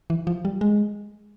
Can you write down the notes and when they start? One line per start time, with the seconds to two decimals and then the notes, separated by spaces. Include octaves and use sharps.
0.10 E3
0.27 F3
0.45 G3
0.61 G#3